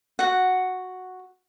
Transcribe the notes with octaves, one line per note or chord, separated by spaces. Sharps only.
F#4 F#5